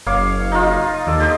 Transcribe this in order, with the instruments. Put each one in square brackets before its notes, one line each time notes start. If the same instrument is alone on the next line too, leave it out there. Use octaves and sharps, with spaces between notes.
[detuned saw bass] F#1 [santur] C#5 F5 D6
[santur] D#4 F4
[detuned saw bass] D#2 [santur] A4 D5
[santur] G4 C5 D#5